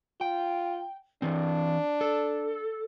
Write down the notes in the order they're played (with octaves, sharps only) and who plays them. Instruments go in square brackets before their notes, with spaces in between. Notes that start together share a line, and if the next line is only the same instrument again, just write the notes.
[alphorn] F4 [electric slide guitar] G5
[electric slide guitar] E3 C4 [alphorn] D4
[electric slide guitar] A4